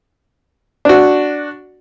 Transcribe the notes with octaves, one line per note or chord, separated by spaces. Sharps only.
D4 F#4